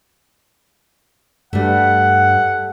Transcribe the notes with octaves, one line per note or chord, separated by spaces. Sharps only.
G2 G3 A3 F#5